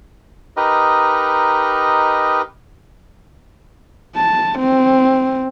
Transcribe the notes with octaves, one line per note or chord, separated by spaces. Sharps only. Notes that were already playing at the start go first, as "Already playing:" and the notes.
D#4 G4 A#4 B4 D#5
A5
C4